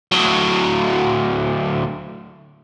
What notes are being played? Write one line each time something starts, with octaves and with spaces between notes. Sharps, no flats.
D2 F#3